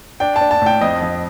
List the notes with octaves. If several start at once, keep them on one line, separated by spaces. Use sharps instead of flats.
D4 G5
A5
D4
A5
A2 G5
F2 D#5
F2